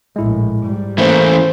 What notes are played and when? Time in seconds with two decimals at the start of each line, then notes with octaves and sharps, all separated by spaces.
0.16 A#1 A2 G#3 E4
0.64 G#2 G3
0.98 E3 A3 A#3 C#4 E4 C5